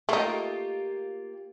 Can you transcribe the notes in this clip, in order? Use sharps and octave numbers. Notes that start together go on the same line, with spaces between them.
A3 A#3 D#4 F4 G4